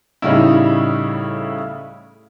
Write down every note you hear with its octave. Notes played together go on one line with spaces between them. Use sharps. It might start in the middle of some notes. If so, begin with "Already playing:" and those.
A2 C#3 G3 D#4 E4